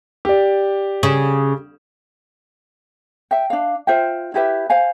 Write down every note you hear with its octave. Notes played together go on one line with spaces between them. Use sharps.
G4 D5
C#3
E5 G5
D4 F5
F4 C5 E5 G5
E4 G4 B4 E5
C5 F5 G#5